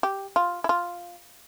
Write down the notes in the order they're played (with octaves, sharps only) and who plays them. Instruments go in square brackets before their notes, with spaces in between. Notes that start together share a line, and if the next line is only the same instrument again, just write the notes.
[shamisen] G4
F4
E4
F4